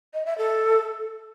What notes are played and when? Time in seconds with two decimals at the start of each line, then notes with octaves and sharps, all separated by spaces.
0.14 D#5
0.26 E5
0.38 A4